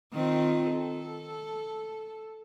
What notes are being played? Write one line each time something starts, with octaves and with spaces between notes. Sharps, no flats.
D#3 C4 F4
A4